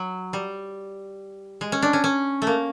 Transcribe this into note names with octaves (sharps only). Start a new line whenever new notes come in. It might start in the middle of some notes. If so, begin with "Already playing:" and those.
Already playing: F#3
G3
G#3
C#4
D4
C#4
C#4
A3
A#3